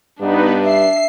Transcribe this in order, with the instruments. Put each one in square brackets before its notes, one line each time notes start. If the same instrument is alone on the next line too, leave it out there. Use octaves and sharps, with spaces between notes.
[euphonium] G2 [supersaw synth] B3 D#4 B4 [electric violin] D4
[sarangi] E5 [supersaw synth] C7